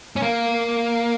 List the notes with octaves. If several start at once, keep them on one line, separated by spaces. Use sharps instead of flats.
C#4
A#3